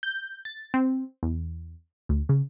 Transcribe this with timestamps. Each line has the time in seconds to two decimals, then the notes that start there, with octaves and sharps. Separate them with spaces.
0.03 G6
0.45 A6
0.74 C4
1.23 E2
2.09 D2
2.29 C#3